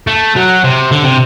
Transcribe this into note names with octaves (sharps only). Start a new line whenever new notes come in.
A3
F#3
C3
D3
C3